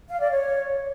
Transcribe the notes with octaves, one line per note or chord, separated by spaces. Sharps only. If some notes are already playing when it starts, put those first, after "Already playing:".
F5
D5
C#5